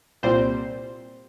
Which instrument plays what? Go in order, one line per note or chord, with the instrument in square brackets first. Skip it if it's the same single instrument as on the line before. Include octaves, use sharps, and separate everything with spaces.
[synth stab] C2 A#2 G3 C4 C5